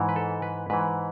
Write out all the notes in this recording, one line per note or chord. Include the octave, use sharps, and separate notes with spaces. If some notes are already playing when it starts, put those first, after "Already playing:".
Already playing: G#2 E3
B4
A4
B4
G#2 E3 B4